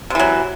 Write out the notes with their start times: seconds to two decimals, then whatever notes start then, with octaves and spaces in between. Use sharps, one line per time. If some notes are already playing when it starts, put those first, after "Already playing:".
0.10 C3
0.15 E3
0.19 F#3